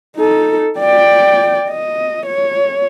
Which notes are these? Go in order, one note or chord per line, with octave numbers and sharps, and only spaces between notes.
D#4 A4
D5 G5
D#5
C#5